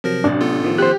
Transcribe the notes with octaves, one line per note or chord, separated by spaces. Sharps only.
C3 F3 F#3 A#4 A#6
A1 D4
B3 F4 A4
D#3 F3
G4 C5 F#6